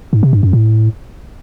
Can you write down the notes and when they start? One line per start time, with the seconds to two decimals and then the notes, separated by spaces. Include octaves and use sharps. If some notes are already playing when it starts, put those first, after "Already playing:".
0.13 G#2
0.23 C3
0.33 G2
0.43 F#2
0.53 A2